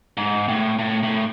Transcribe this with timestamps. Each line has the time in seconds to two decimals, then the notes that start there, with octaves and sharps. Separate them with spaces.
0.17 G#2
0.48 A2
0.79 A2
1.03 A2